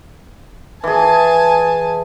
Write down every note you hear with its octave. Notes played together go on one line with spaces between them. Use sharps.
E3 G#4 G#5 A5